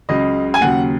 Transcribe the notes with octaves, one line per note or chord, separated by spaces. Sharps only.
C#2 C#3 F#3 D#5
G#5
D#2 C#3 F#3 F#5